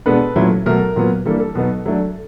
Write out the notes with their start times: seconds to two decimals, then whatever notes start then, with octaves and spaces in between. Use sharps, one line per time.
0.06 B2 G#3 B3 D4 A4 B4
0.36 A#2 F#3 A3 C#4 E4
0.66 B2 F#3 A3 A#4
0.96 A#2 F#3 B3
1.26 E3 G3 A#3 D4 A4
1.40 A4
1.55 B2 F#3 B3 D#4
1.86 F#3 A3 D4